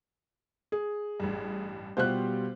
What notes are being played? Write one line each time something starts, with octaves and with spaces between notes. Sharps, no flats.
G#4
A1 G2
B2 G3 F4 G4 C5 F#6